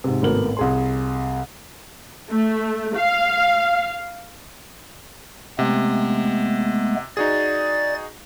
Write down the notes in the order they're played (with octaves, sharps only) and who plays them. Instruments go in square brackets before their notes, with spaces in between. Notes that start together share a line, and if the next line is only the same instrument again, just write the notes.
[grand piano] G#2 C3
G#1 A2 A3 B3 A#4 F#7
C2 G#4 C6
[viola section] A3
F5
[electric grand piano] C3 [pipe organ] G#3 A3 B3
[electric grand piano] D#4 F#4 G#4 [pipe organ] D5 A6